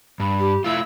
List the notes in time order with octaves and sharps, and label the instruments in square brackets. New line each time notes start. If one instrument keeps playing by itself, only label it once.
[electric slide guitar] G2 [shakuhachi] B5
[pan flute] G4
[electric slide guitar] A3 F4 [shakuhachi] E4 [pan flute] E6